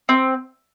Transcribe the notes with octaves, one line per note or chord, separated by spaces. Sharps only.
C4